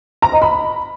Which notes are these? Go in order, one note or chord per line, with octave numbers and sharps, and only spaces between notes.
A#5
D#5
B5